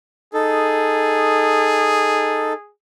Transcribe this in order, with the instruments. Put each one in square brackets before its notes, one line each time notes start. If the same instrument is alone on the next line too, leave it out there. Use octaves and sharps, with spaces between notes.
[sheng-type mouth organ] D#4 A4 [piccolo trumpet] G#4